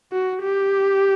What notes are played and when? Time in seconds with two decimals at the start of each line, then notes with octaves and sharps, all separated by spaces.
0.12 F#4
0.42 G4